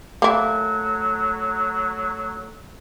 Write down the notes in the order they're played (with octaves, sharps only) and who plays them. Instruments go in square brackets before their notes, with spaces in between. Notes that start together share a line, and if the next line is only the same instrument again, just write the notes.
[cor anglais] F#3 [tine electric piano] A3 A4 [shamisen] A#3 E4